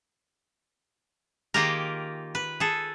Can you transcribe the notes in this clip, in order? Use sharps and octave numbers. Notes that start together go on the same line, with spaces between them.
D#3 A#3 F4 G4 G#4 A#4
B4
G#4 A4